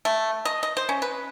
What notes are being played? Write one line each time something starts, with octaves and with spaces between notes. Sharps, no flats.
A3
D#5
D#5
C5
C#4
B4